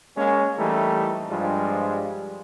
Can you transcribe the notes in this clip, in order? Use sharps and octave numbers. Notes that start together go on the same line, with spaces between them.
G#3 A#3 C#4
E3 G3 A3 A#3 D#4
G2 F3 G3 G#3 F4